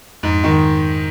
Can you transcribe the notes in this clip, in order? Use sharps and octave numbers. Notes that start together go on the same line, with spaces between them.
F2 G#2
D#3